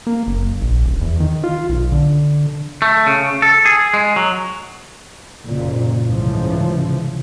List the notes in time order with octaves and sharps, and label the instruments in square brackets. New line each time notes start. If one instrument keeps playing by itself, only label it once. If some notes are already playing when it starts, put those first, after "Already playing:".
[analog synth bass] A#3
F#1
A#1
D#1
E2
D#3
F4
B1
D3
[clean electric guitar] A3
C#3
A4
G#4
G#3
F#3
[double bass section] F#1 F2 A#2
C2 G#2 C#3 E3 F3